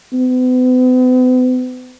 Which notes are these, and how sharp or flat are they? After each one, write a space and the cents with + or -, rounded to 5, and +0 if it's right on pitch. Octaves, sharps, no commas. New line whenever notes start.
B3 +45